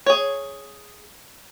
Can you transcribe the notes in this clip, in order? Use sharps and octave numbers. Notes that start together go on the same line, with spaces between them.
G#4 C#5